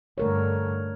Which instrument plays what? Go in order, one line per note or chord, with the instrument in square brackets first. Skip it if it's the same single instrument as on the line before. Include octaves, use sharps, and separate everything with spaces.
[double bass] G2 D3 [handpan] A3 A#4 C#5